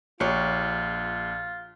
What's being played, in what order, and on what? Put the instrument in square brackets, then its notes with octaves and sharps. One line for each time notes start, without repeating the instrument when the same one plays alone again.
[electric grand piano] A#1 [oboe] F4 [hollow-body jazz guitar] G4 C#5